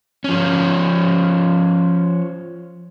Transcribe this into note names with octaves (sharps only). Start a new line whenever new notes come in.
F3 C#4